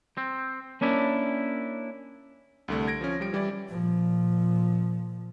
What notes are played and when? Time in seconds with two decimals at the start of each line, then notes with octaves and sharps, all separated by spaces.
0.17 C4
0.81 A#3 C#4 D4 E4
2.68 C2 D3 A3
2.88 G#6 A#6 D7
3.01 F3 C#4
3.20 F3 G3 D7
3.32 E3 G3 E4 D5
3.68 A#2 F3